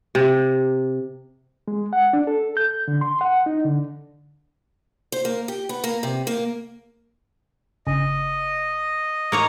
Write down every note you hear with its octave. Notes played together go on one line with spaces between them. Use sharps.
C3
G#3
F#5
D4
A4
G6
D3
C6
F#5
D#4
D3
C5
A#3
G4
B3
A#3
C3
A#3
G1 C#3 D#5
A#3 C#5 A#5